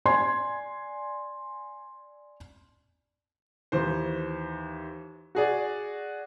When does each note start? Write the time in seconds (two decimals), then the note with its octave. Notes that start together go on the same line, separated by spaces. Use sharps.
0.05 D5 G#5 C6 G#6
3.72 D#2 E3 C5
5.35 F#4 G#4 D5